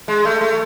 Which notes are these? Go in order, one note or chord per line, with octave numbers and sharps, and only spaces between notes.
G#3
A3
A3